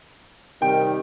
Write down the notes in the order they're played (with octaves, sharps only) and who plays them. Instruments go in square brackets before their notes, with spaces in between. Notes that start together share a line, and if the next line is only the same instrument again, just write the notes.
[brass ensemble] C3 D#3 G3 [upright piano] G5